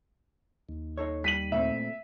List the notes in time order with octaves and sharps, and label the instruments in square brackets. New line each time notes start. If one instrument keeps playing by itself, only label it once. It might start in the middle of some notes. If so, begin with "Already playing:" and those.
[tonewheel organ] D#2
[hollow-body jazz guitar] D#4 A4 C#5
[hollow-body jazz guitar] G3 [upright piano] B6 D#7 F#7
[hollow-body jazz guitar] A#2 A3 C4 [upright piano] E5